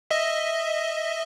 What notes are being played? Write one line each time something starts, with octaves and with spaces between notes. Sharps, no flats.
D#5 E5